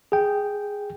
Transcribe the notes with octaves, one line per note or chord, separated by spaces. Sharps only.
G#4 G5